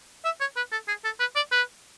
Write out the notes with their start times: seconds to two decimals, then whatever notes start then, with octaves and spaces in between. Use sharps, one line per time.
0.25 E5
0.41 C#5
0.56 B4
0.72 A4
0.88 G#4
1.04 A4
1.20 B4
1.36 D5
1.52 B4